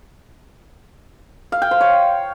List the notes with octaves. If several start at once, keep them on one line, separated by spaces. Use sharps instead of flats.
F5
G5
C5
C#5